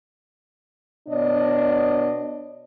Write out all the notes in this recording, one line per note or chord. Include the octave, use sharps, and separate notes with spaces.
B2 D4 C#5 D#5